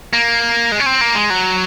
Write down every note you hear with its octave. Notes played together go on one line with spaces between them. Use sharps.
A#3
G#3
C#4
C4
A#3
G#3
F#3